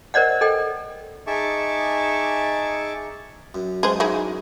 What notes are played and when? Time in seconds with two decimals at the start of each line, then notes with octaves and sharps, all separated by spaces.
0.14 A#4 C5 D5 D#5 F#5
0.41 A4 D#5 G5
1.27 D#4 G#4 E5 A5 C#6 D6
3.55 F#2
3.83 F#2 G#3 G#4 C5
4.00 D#4 E4 G#4